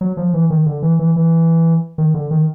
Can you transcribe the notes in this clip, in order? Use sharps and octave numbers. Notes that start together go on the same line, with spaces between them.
F#3
F3
E3
D#3
D3
E3
E3
E3
D#3
D3
D#3